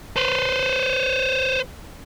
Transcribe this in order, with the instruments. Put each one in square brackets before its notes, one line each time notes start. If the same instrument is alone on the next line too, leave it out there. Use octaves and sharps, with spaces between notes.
[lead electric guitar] B4 C5